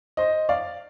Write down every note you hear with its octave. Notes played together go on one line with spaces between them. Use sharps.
C5 D#5
D5 F5